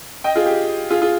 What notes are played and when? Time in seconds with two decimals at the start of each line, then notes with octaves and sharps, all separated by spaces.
0.24 D#5 G5
0.36 F4 G#4
0.46 G4
0.90 F4 G#4
1.01 F4 G#4